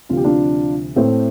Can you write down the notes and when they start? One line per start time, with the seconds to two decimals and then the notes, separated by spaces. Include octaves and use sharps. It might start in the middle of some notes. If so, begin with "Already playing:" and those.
0.09 D2 C3 F3 F4
0.17 G4
0.24 D4 F4
0.96 A2 A3 C4